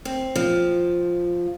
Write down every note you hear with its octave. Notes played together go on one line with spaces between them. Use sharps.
C4
F3